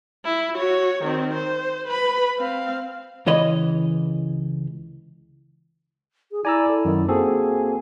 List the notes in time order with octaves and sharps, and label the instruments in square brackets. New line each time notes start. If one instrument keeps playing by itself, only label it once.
[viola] E4
F#4 C#5
D#3 C4
C5
B4 B5
C4 F5
[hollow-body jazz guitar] C#2 E3 C#5 D#5 B5
[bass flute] G#4
[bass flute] E4 [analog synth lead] D5 [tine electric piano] G#5 A#5 E6
[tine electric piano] A4
[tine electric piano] F#2 [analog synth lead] D#3
[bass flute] A#3 [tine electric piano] C4 F#4 A4 [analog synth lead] G#4